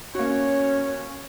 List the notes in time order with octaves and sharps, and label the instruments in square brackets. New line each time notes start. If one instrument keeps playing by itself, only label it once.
[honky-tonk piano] A#3 F#4 [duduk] C#4 [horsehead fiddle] C#5